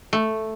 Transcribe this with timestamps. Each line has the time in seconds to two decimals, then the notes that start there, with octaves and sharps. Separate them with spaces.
0.13 A3